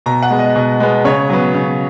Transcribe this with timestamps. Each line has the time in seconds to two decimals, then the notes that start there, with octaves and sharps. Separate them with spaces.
0.06 B2 A#5
0.22 F#5
0.30 G#3 B3
0.39 D#5
0.56 B2
0.80 G#3 B3
1.05 C#3 C#5
1.30 F#3 B3
1.55 C#3